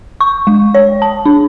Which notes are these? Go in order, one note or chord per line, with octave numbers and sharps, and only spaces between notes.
C#6
G#3
C#5
A5
D4